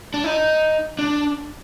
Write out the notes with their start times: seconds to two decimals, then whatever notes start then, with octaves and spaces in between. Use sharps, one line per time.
0.14 D4
0.24 D#4
0.99 D4